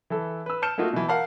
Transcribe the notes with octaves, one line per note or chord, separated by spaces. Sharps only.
E3 A4
B4 E6
A5 F6 G6 C#7 E7
A3 A#3 D#4 F4 F#4
B2 E3
A#4 F5 F#5 A5